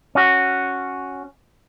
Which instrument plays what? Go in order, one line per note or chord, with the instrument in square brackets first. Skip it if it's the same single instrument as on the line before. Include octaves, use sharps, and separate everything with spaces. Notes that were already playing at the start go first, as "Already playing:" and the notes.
[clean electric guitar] C#4 F#4